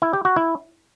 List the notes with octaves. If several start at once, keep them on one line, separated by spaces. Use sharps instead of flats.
E4
G4
F#4
E4